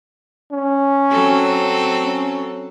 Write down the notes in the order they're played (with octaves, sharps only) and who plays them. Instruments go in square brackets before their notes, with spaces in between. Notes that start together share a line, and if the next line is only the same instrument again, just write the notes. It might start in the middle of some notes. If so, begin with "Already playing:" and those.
[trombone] C#4
[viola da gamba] F#3 C4 A4
[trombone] C#4